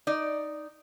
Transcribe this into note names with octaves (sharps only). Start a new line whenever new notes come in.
D#4 D5